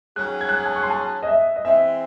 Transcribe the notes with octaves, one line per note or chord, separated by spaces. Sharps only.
D#3 F#3 C#4 G#4 F#6
G#6
F#6
G#6
A5
C#6
C6
A5
D#5
E5
D#5
E3 G#3 C4 E5